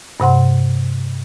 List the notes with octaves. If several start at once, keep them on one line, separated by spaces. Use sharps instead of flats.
G2 C3 F#5 C6